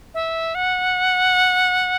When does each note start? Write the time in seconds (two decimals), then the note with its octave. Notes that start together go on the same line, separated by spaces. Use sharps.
0.14 E5
0.55 F#5